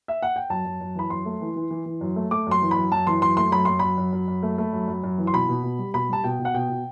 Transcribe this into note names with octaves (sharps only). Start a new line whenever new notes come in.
E5
F#5
G5
F#2 A5
F#2
F#2
E3 B5
F#2 C6
A3
E3
E3
E3
E3
F#2
A3
A3 D6
F#2 C6
E3
B5
F#2
F#2 A5
E3 C6
F#2 C6
A3 C6
F#2 B5
F#2 C6
F#2 B5
F#2
F#2
F#2
A3
A3
F#2
F#2
F#2
E3
C6
B2 B5
B2
B2
G3
B2 B5
G3 A5
B2 G5
B2
F#5
B2 G5
B2